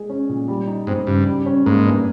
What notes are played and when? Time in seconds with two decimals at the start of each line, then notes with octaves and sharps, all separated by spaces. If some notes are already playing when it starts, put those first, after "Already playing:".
Already playing: G#3 G#4
0.10 C#4
0.29 A#2
0.48 G3
0.68 D#4
0.87 G#2 C4
1.07 G2 C#3
1.27 G3
1.46 C#4
1.66 G#2 A#3
1.85 G2